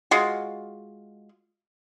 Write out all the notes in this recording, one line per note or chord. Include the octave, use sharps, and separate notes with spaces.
G#3 F4 F#4